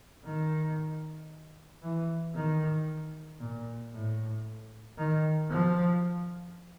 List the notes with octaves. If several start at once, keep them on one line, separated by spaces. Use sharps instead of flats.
D#3
E3
D#3
A#2
A2
D#3
F3